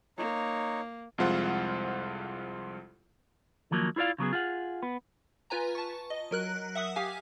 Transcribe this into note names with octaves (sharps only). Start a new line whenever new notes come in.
A#3 D#4 C#5
C2 F2 G#3 F4 C5 F#5
D#3 F3 F#3 A#3 A#4
E4 F4 C5 D5 F5
C#3 F#3 B3 G#4
F4 G#4 F#5
B3
F4 B4 G#5 A#5
A5 C#6
D#5
F#3 A#4 F#6
E5 F#5 D#6
G4 F5 G#5